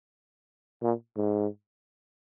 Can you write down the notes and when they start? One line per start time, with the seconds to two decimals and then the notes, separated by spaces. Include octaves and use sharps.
0.83 A#2
1.16 G#2